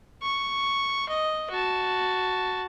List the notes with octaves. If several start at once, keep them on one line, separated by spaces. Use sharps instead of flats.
C#6
D#5
F#4 A5